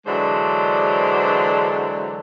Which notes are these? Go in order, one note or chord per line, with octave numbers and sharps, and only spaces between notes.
D3 E3 F#3 G#3 D4 C5